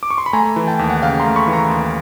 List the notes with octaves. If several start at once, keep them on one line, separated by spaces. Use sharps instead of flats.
D6
C#6
C6
B5
A3 G#5 A#5
E3
G5 A5
D#2
F#5
C#3 F5 G5
A#5 C6
A3
B5 C#6
E3
A#5 C6
D#2